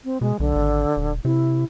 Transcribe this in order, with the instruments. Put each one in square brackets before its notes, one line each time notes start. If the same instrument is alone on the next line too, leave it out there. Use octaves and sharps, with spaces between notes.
[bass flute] C4
[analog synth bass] B2 [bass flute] G#3
[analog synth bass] B1 [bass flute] D3
[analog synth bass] G#1
D#1
[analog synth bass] C3 [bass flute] E4